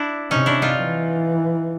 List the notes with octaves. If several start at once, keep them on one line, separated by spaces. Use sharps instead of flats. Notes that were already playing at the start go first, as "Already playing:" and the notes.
Already playing: D4 E4
C3 C#4 D#4
D4 E4
D#4 F4
E3